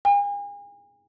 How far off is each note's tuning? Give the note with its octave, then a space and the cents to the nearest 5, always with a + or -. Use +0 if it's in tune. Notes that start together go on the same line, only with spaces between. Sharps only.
G#5 -40